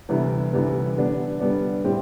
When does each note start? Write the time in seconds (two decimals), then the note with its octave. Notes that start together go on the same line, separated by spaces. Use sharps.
0.09 D2 C3 E3 G3 B3
0.53 D2 C3 E3 G3 B3
0.96 D3 G3 B3 D4
1.40 D3 G3 B3 D4
1.84 A2 G3 C4 G4